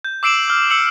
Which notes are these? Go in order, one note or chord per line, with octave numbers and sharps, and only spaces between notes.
G6
D6 E6 C7 D7 E7 F#7
E6 F6
E6 C#7 F#7